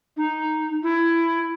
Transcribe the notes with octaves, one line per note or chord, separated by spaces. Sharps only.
D#4
E4